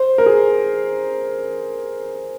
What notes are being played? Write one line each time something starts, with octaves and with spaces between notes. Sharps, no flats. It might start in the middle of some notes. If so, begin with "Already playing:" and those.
Already playing: C5
A#4
G#4